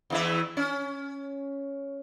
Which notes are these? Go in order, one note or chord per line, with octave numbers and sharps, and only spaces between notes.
E2 E3 E5
C#4